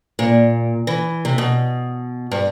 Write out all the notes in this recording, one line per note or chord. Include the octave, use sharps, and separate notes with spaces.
A#2
E3
C3
B2
G2